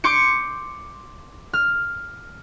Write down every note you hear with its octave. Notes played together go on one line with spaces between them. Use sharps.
C6 D6 G6 C#7
F6